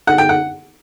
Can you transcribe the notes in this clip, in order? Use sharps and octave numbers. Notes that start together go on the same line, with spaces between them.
F#5
G5
F#5